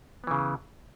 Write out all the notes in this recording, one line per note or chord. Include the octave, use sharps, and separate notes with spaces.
C#3 E3 B3